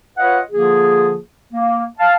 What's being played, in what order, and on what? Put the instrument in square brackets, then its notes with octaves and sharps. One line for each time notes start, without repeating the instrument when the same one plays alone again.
[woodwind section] F4 B4 C#5 D#5 F5 F#5
D3 F3 A#3 F4 G#4
A#3
F5 A5